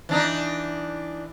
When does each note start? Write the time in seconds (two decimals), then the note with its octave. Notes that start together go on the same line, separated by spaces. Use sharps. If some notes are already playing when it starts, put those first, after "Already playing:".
0.09 E3 D4 D#4